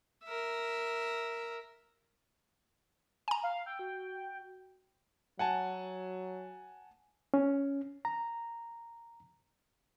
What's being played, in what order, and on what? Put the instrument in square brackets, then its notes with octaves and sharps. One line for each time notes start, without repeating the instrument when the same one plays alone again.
[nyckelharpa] A#4 E5
[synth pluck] G#5 A#5
[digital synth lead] F5
[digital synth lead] G5 [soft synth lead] E6
[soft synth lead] F#4
[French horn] F#3 [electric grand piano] F#5 G#5 A5
[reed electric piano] C#4
A#5